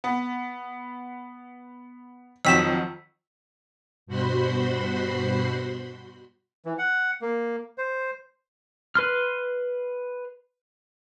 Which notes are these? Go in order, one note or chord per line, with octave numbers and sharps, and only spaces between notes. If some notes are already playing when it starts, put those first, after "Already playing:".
B3
F2 D#3 F#3 E6 B6 E7
G2 B2 F#4 C5 B5 C6
E3
F#5
A#3
C5
B4 C6 F6